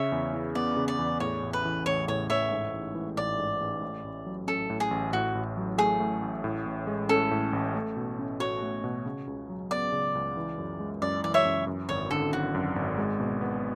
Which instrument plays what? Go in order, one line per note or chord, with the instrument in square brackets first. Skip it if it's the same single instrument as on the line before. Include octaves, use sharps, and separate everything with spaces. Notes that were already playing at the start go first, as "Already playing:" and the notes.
Already playing: [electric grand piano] C#3 [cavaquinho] C#5 E5
[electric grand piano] E2
E3
[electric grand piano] B3 [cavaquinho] D5
[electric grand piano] C#3
[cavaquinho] D5
[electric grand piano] E2
[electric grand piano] A2 [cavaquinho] C#5
[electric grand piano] A1
[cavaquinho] B4
[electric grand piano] E3
[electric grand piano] A1 [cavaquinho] C#5
[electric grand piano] A2 [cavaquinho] C#5
[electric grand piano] A1 [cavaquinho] C#5 E5
[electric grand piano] G#2
A1
E3
[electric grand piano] A1 [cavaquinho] D5
[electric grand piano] G#2
A1
A2
A1
F#3
[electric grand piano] C#4 [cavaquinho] A4
[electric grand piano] A2
[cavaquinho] G#4
[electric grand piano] A1
[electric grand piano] A2 [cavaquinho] F#4
[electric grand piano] A1
F#3
[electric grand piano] A3 [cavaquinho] G#4
[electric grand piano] A2
A1
A2
A1
G#3
[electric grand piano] C#4 [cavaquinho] A4
[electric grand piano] A2
A1
A3
B2
C#4
[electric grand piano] F#4 [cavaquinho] C#5
[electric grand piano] A3
B2
C#3
C#2
F#3
[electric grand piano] B3 [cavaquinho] D5
[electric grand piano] C#3
C#2
E3
F#2
G#3
[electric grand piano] F#2 [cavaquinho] D5
[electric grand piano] E3 [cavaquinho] D5
[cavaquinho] C#5 E5
[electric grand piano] F#2
F#2
[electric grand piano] G#1 [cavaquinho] C#5
[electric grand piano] D3 [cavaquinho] A4
[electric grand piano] G#1 [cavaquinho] F#4
[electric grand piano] F#2
G#1
G#3
B2
B3